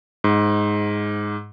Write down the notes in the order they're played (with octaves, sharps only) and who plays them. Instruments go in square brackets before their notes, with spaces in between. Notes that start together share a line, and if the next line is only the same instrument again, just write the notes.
[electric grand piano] G#2